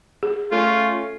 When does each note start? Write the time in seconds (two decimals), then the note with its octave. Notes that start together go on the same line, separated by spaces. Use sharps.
0.23 G#4
0.52 A3 C#4 F4